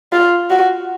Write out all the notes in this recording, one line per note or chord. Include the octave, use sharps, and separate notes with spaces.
F4
F#4